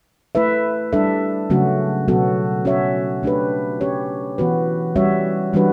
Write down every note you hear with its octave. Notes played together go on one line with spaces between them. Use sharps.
A3 E4 B4 E5
G3 D4 A4 E5
C#3 F#3 A3 C#4 F#4
B2 F#3 B3 F#4 A4
C#4 F#4 C#5 E5
A3 D4 G4 B4
C#4 G4 C#5
E3 B3 F#4 B4
G3 C#4 F#4 C#5 E5
E3 G3 D4 F#4 B4